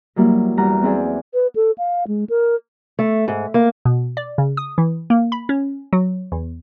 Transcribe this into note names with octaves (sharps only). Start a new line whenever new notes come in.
F#3 G3 A#3 E4
E2 G3 F#5 A#5
B3 C4 E4 G#4 D5
B4
A4
F5
G#3
A#4
A3
G#2
A#3
B2
D5
C#3
D#6
E3
A#3
B5
C#4
F#3
E2